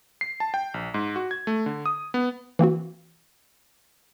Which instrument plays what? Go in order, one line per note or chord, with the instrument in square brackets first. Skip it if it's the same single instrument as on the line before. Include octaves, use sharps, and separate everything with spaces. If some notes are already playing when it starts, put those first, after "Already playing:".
[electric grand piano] C7
A5
G5
A#1
G#2
F#4
G#6
A3
D3
D#6
B3
[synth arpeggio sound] E3 A#3 C4 F#4